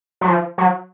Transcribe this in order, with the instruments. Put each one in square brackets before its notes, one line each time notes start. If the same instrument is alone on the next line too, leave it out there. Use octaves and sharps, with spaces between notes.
[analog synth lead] F#3
F3
F#3